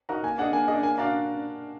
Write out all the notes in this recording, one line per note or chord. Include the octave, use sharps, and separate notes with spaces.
D#4 F#4 A#4 A#5
A#3 G#5
D4 G#4 D#5 F#5
A#3 G#5
D4 G#4 D#5
A#3 G#5
D4 F#4 D5 F5 A#5